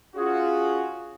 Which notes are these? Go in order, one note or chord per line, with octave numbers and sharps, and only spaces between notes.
C#4 F4 F#4 G#4